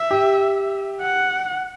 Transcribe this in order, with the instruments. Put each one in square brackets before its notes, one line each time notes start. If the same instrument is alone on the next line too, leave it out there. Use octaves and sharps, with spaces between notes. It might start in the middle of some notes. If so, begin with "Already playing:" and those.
Already playing: [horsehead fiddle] E5
[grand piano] G4
[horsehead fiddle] F#5